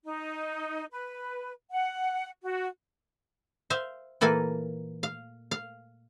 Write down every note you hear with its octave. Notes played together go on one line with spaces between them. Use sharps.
D#4
B4
F#5
F#4
C5 E5 F5
A#2 E3 A#3 A4 G#5
F5
F5